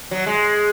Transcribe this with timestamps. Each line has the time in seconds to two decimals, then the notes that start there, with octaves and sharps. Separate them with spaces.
0.11 F#3
0.26 G#3